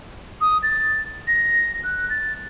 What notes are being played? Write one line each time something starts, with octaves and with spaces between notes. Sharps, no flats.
D#6
A6
A#6
F#6
A6